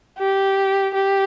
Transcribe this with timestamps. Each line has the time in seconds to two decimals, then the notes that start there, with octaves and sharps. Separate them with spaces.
0.19 G4
0.94 G4